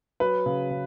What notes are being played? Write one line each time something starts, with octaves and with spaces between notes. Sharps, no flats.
F#3 B4
C#3
C#3